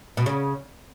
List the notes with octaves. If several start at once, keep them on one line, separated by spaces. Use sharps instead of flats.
B2
C#3